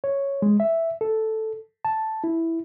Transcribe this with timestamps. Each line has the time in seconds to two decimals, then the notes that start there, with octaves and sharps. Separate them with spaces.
0.04 C#5
0.42 G#3
0.60 E5
1.01 A4
1.85 A5
2.24 E4